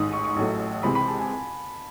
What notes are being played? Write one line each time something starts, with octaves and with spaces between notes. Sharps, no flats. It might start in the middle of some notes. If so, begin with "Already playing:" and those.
Already playing: A1 G#2 D#3 D#6
C#6
C#6
A1 A2 F#3 A3
C#2 C3 E3 G#3 C4 B5
B5
A5
G#5